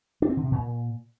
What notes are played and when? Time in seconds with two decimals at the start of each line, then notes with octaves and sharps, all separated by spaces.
0.22 D4
0.29 C4
0.37 D3
0.44 C3
0.51 A#2